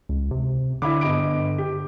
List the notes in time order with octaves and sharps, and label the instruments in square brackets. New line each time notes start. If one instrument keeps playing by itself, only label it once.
[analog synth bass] C#2
C3
[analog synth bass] D3 [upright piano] E4 B5 D6
[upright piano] G1 D#5 D7
G4